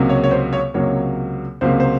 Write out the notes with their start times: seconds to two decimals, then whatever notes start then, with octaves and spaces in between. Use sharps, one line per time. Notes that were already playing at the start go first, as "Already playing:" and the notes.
Already playing: C#2 C3 F#3 A#3
0.09 C#5
0.24 C#5
0.31 C5
0.53 C#5
0.74 C#2 C3 F#3 A#3 C#5
1.61 C#2 C3 F#3 A#3 C5
1.80 C5